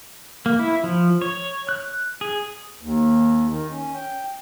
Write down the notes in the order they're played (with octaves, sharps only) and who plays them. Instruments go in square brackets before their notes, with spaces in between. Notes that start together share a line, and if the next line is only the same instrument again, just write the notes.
[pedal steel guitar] A#3
E4
F3
C#5
F#6
G#4
[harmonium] D#2
D#3
C#4
G5